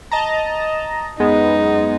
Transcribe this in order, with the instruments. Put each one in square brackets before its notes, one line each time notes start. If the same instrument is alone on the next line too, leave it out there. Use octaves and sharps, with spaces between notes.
[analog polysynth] D#5 A5 A#5
[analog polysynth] F#2 G#3 B3 [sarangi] D#4